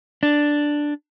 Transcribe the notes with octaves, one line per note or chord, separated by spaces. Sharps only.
D4